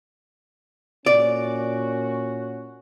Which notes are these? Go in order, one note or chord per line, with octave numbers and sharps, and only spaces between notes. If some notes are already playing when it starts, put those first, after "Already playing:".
A#2 C#4 F#4 D5